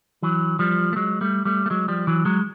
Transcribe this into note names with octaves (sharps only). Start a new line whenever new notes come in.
E3 F#3
F3 G3
A3
F#3 G#3
G3 A3
G3 A3
A3
F#3 G#3
F3 G3
E3 F#3
F#3 G#3